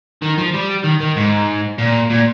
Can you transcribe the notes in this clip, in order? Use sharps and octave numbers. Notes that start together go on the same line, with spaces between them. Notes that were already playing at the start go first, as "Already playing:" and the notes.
D#3
F3
G3
D#3
D#3
G#2
A#2
A#2